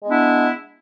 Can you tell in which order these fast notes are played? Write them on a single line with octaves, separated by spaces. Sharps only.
G#3 B3 D4 E4